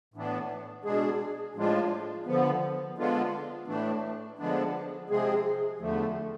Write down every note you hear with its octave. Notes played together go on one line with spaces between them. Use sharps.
A2 E3 B3 D4
B2 G#3 D4 G#4
A2 F3 G#3 D4 F4
D3 F3 B3
D3 G#3 B3 D4 F4
A2 E3 A3 D4
D3 F3 G#3 B3 D4
C3 F3 G#3 C4 G#4
E2 D3 F3 A3